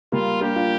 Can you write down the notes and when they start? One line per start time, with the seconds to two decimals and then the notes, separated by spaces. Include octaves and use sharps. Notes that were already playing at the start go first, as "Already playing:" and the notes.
0.12 G3 A#3 F4
0.41 A#3 D4 G4
0.56 D4 F4